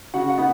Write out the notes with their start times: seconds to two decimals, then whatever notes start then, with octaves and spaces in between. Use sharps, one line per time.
0.14 C#3 F#4 F#5
0.30 F#5
0.38 B3 D#4